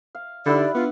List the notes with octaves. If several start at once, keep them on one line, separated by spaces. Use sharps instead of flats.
F5
D3 D#4 E4 G4 D5 F#5 B5
B3 D4 F4